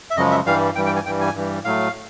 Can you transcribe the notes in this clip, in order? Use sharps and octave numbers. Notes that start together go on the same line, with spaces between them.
E5
F#2 C#3 F3 G#3 D#5
E5
G2 E3 G3 F5
G2 E3 G3 G5
G5
G#5
G2 E3 G3 G5
G#5
G2 E3 G3
A2 F#3 A3 F5